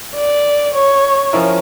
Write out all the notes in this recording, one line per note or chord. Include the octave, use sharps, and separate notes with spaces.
D5
C#5
F3 C#4 E4 A#4